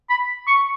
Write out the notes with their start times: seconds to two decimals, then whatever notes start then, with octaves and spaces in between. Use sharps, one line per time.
0.10 B5
0.47 C#6